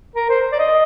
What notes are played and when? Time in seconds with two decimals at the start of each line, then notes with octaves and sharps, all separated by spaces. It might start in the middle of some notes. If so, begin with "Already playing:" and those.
0.15 A#4
0.30 C5
0.52 D5
0.59 D#5